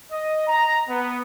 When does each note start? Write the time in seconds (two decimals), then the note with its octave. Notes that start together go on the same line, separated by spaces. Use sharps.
0.11 D#5
0.47 A#5
0.88 B3